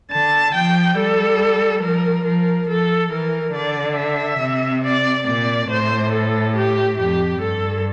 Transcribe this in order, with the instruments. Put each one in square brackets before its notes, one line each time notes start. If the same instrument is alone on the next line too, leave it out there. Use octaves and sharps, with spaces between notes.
[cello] D3 [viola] A5
[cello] F3 [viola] G5
[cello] G3 [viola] A4
[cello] F3 [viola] A#4
[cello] F3 [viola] A#4
[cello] F3 [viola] A4
[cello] E3 [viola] A#4
[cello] D3 [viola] D5
[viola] E5
[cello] C3
[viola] D5
[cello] A#2 [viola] D5
[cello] A2 [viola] C5
[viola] A4
G4
[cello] F2 [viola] G4
[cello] G2 [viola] A4